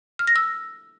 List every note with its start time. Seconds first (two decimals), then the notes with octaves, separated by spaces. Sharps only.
0.19 F6
0.27 A#6
0.36 E6